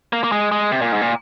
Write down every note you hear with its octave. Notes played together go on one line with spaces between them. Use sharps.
A#3
A#3
G#3
G#3
C3
A#2
G#2
A#2